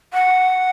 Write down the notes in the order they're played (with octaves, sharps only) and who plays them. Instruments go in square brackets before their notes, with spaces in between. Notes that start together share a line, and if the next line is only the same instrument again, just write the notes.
[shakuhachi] F#5